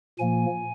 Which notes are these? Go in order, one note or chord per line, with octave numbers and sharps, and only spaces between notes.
A#2 F3 A#3 G#5